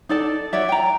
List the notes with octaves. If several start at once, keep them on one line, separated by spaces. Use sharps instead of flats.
D#4 A4 D5 A5
F#4 C#5 D5 E5
G5 A#5